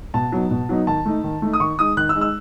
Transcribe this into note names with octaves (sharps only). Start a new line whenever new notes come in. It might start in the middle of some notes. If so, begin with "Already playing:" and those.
B2 A5
F#3 B3 D#4
B2
F#3 B3 D#4
D#3 A5
A3 D#4
D#3
A3 D#4
D#6
D#3 C#6
G#3 D#4 D#6
D#3 F#6
E6
G#3 D#4
E6